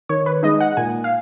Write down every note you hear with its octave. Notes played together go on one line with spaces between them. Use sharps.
D#3 C#5
B4
G#3 D#4 D#5
F#5
A#2 G#5
F5